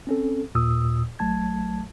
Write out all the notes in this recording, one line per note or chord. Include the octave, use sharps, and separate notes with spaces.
C4 C#4 A4
D#2 A#2 D#6 E6
A1 F#3 A3 A5 G#6